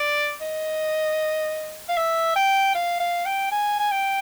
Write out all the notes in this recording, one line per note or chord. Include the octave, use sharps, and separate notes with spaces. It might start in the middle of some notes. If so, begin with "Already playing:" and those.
Already playing: D5
D#5
F5
E5
G5
F5
F5
G5
G#5
G#5
G5